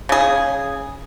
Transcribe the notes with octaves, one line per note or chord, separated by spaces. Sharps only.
C#3 G#4